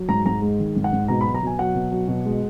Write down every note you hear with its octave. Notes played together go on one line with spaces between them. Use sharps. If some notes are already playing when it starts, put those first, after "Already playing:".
Already playing: F#3
G#2 A#5
G#2 A#5
G#3
D#3
G#2
F#5
G#2
B2 A#5
B5
F#3
A#5
B2 G#5
F#3 F#5
B2
F#3
B2
G#3